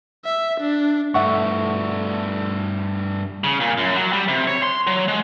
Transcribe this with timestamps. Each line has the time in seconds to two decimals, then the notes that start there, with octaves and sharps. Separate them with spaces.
0.25 E5
0.60 D4
1.14 G2 A3 E5 F#5 C#6
3.44 C#3
3.60 A#2
3.78 F#2
3.96 F#3
4.13 G3
4.28 C3
4.47 C#5
4.63 C6
4.87 F#3
5.08 G#3